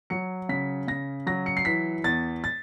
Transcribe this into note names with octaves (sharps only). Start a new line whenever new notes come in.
F#3 C#7
C#3 B6
C#3 A#6
F#3 A#6
C#7
C7
E3 B6
E2 A6
A6